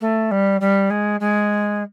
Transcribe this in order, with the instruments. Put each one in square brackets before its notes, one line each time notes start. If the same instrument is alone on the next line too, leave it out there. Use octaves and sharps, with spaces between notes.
[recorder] A3
G3
G3
G#3
G#3